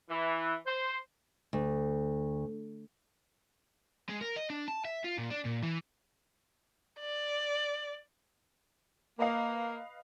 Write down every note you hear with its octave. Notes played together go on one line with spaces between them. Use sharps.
E3
C5
D2
G#3
A#4
D#5
D4
A5
E5
F4
A#2
D4
A#2
E3
D5
A#3 B4 D#5 F5